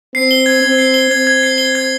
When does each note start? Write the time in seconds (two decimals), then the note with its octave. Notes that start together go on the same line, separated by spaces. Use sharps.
0.14 C4 C7
0.31 G7
0.46 G#6
0.63 C4 G#6
0.78 C7
0.94 G7
1.11 C4 G#6
1.27 G#6
1.43 C7
1.58 G7
1.75 G#6